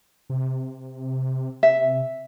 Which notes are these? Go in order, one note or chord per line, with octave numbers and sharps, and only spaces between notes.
C3
C3 E5